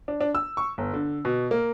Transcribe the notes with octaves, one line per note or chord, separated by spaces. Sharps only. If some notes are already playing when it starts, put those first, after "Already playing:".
D4
D4
E6
C#6
G1
D3
B2
A#3